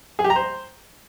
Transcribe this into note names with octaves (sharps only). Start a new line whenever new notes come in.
G#4
G4
A#5
C5